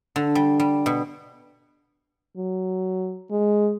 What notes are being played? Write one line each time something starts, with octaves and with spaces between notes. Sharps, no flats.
D3
G3
G3
B2
F#3
G#3